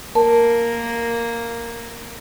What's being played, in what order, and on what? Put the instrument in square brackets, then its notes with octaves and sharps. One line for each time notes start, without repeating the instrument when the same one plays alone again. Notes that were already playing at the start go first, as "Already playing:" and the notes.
[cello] A#3 [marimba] A#4 A5